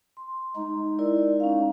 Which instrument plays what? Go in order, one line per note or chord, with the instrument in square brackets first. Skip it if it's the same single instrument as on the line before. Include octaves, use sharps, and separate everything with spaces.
[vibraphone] C6
[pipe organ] G#3 D#4
[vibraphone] E4 A#4 D5
C#4 F5